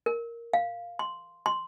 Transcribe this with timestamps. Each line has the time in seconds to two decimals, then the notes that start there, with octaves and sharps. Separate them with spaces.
0.06 A#4
0.53 F5
0.99 C6
1.46 C6